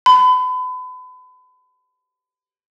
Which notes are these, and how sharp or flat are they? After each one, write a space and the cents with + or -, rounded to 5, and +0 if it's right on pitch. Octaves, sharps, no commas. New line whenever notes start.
B5 +35